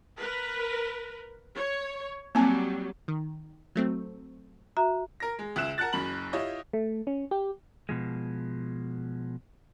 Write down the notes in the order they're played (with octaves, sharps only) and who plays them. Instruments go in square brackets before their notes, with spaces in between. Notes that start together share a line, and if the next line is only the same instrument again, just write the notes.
[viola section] A#4 B4
C#5
[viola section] F#3 G3 [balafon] A#3 C4 G#5
[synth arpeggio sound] D#3
F#3 A3 C4
[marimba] F#4 E5 A#5
[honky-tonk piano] A#4 A#6
G#3
C#2 E5 F#6 E7
A#4 F#5 A5 F#6 A6
F#1 F#2 B5 F#7
E4 F4 G4 C#5 D#5
[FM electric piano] A3
C#4
G4
[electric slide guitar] B2 F3 G#3